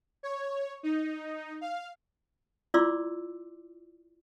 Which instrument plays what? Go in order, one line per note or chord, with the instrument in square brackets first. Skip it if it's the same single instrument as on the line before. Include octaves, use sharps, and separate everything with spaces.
[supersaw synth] C#5
D#4
F5
[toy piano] E4 F4 D5 C6 D6 E6